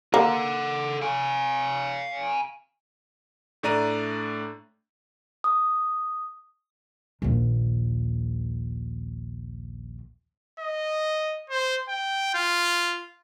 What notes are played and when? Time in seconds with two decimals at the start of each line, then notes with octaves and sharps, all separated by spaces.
0.14 A#3 A4 F#5
1.02 F5 G#5
3.63 A2 A3 D4 D5 A#5 D#7
5.44 D#6
7.22 A#1 D#2
10.60 D#5
11.49 C5
11.89 G5
12.34 F4